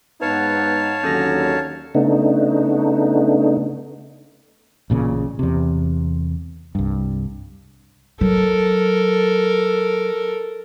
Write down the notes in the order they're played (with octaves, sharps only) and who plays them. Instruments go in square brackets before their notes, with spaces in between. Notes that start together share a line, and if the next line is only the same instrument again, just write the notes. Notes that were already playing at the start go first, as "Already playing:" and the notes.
[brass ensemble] G#2 B3 D#4 [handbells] B4 [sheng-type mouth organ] C#5 F5 A5
[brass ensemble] D#2 D3 F#3 [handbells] C#4 A4 A#6
[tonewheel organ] C#3 A3 B3 D4 D#4
[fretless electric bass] A1 A#2 C#3
E2 C3
C2 G2
[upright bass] F#3 [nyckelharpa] A4 A#4